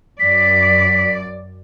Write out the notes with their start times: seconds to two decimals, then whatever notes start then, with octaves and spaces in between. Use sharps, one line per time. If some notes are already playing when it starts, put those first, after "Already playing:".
0.20 F#2 D5 B6